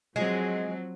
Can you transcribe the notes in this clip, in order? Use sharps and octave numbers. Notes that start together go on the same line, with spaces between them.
F3 F#3 G#3 C4